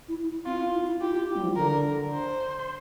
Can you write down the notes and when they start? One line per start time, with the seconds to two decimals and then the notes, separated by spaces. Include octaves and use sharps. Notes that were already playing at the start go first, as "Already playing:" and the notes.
0.08 E4
0.46 C4 F4
0.59 E4
0.73 F4
0.87 E4
1.01 F4 G4
1.15 F4
1.28 E4
1.36 G3
1.43 F3
1.56 D3 A#4
2.13 C5